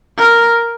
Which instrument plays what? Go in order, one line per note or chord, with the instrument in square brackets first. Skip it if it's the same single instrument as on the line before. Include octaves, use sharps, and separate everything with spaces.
[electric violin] A#4